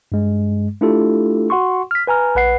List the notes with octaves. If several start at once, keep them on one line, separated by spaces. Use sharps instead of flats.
G2 G#3
A3 D4 E4 F4 G4 A4
F#4 F#5 C6 C#6
F6 B6
B4 G#5 A#5 F6
A#1 B4 F#5 C7